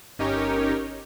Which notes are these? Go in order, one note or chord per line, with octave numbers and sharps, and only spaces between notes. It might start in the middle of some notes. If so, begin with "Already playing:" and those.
G1 C#4 D#4 G4 A#4 C#5